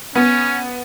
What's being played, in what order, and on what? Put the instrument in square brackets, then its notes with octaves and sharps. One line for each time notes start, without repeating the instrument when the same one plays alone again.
[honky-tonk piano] B3 [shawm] C#4